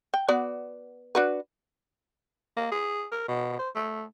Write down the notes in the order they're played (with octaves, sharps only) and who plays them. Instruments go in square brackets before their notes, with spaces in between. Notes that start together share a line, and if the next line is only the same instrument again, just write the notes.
[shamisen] G5
B3 F#4 D5
D4 F#4 B4
[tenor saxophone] A#3
G#4
A#4
B2
C5
A3